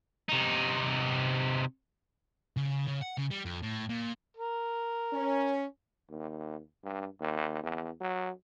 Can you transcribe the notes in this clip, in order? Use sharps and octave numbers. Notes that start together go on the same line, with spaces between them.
C3 D#4
C#3
C#3
F#5
C#3
G3
F2
A2
A#2
A#4
C#4
D#2
G2
D#2
E2
F#3